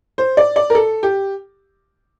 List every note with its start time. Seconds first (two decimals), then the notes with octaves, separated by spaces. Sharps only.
0.18 C5
0.37 D5
0.56 D5
0.70 A#4
0.75 A4
1.03 G4